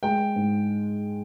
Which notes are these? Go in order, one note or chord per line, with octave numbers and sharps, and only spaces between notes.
G#3 G5
G#2